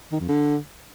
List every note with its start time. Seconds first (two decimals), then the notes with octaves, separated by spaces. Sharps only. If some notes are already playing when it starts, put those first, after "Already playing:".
0.12 D#3
0.20 F2
0.28 D3